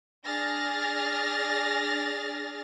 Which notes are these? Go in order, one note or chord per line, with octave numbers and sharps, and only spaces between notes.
D4 G#4 F6 A6 A#6